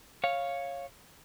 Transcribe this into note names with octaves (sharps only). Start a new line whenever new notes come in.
C#5 F5